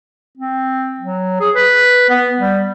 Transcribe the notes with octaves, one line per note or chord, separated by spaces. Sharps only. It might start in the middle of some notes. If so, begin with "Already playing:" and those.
C4
F#3
G#4
B4
B3
G3